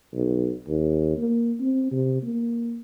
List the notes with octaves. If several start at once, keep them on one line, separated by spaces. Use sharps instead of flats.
B1
D#2
A#3
C4
C3
A#3